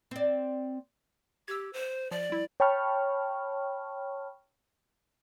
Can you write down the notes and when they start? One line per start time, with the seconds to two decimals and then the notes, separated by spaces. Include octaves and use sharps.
0.11 C4 D5
1.48 G4 E6 G#6
1.73 C5
2.11 F3 D5
2.30 G3 E4
2.60 C#5 G5 A5 B5 C#6 F6